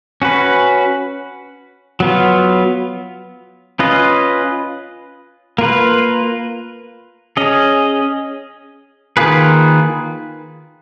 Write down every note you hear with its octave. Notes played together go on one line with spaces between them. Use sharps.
C#4 F#4 B4
F#3 B3 F4
C#4 F4 B4 D#5
A#3 F4 B4
C#4 G#4 D#5
D#3 A#3 F4 G#4 B4